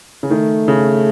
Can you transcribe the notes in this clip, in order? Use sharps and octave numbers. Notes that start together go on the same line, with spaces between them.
C#3
D#3 A3
C#3